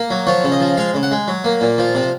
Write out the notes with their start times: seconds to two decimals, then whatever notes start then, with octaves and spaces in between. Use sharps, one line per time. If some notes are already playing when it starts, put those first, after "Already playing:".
Already playing: A#3
0.10 F#3
0.27 F3 C#5
0.44 C#3
0.52 D#5
0.60 F3
0.77 G#3 F5
0.94 C#3
1.03 F#5
1.11 G#3
1.28 F#3
1.44 A#3
1.61 A#2
1.78 F3
1.95 C3